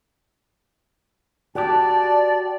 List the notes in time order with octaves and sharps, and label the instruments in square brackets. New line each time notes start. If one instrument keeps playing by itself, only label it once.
[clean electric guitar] F#4 G4 [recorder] D5 [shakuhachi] A5